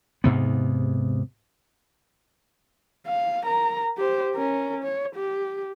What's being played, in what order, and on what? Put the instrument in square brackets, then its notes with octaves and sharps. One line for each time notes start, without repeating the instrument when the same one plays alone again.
[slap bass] D#2 G#2 C3 B3
[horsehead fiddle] F5
A#4 A#5
G4 C5
C#4 A#4
C#5
G4